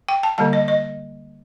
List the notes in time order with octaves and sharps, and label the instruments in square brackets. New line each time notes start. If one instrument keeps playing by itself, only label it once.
[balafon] G5
A5
D3 G3 A#3 A5
D#5
D#5